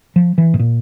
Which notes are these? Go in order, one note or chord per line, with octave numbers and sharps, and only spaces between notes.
F3
E3
A2
A#2